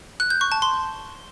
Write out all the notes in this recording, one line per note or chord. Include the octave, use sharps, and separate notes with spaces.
F#6
G6
C#6
A5
C6